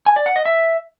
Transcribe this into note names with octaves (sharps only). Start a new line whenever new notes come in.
G#5
D5
F#5
D#5
E5